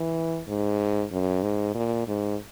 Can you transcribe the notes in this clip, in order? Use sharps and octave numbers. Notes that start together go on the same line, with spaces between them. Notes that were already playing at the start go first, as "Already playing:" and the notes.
Already playing: E3
G#2
F#2
G#2
A#2
G#2